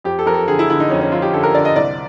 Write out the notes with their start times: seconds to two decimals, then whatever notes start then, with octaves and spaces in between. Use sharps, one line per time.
0.04 F2 G4
0.19 A4
0.26 F2 A#4
0.34 A4
0.48 D3 G#4
0.59 E4
0.70 D3 E4
0.80 D#4
0.90 F2 C#4
1.01 C#4
1.12 F2 F4
1.22 G4
1.33 D3 A4
1.43 A#4
1.55 D3 D5
1.65 D#5
1.76 C2 D5